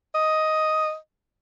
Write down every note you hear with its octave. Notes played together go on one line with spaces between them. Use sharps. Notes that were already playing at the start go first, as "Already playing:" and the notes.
D#5